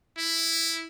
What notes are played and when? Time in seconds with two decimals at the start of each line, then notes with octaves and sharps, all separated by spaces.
0.18 E4